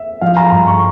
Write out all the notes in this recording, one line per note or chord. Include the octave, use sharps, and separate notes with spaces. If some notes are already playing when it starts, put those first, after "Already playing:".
Already playing: E5
F3 F5
A#5
G2 C6
C#6